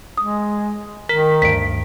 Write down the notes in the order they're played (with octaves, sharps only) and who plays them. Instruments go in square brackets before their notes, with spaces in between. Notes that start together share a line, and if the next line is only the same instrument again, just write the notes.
[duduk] G#3 [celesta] D#6
[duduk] D#3 [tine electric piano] A#4 [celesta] B6
[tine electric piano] D2 G2 [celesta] B6 D7